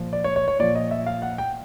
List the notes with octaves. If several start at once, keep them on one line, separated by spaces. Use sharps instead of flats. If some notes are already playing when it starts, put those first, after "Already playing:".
Already playing: A#2 F3
D5
C#5
C#5
C#5
A#2 F3 D5
D#5
E5
F5
F#5
G5